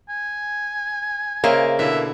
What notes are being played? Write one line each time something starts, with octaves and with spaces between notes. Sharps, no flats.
G#5
C#3 A#3 C5 D#5 E5
B2 D3 E4 E5